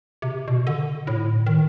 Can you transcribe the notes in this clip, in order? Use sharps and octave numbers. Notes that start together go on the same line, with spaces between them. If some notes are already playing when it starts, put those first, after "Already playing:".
C3
B2
D3
A2
D#3